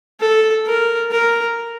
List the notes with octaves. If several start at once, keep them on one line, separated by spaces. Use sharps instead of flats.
A4
A#4
A#4